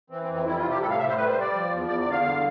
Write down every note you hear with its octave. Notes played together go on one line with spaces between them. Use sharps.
E3 C4
C4
F2
C4
G3 E4
F4
C3
G4
A2 A4
F5
A2 E5
C5
G3 B4
C5
G3
D5
F3
E2
E2 D5
D5
D3
F5
G2